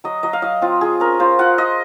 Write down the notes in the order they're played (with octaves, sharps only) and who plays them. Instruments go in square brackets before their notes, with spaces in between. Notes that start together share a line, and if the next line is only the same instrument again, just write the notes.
[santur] F#3 D#5
F#3 D#5
F5
F#3 D#5
C4 F4
F4 G#4
C#4 A#4
F4 C5
F4 F#5
F4 D#5